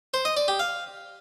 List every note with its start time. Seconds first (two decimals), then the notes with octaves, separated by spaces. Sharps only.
0.14 C5
0.25 D#5
0.37 D5
0.48 G4
0.59 F5